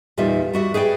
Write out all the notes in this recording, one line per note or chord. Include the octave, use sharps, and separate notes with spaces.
E2 A#2 G3 D#4 F4 E5
G3 F#4 E5
G#4 B4 D5 G5